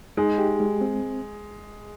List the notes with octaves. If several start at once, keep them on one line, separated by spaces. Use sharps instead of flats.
G#3 D#4
G4
G#3
C4